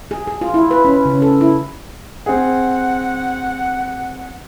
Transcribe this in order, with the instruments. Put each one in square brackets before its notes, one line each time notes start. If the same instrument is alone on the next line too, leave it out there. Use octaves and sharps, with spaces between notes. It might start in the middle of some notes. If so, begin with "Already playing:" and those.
[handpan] G#4
G#4
F4
E4
B4
C#4
C#3
A4
E4
[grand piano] C4 G#4 [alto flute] F#5